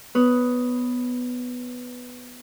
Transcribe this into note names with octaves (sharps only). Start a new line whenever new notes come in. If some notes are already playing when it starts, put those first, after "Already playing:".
B3 B4 C#5 D#6 F#6